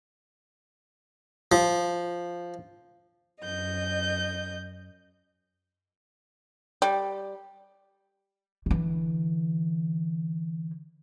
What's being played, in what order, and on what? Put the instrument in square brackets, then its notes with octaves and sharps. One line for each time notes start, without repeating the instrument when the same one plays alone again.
[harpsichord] F3
[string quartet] F#2 D#5 G6
[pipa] G3
[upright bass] D3 E3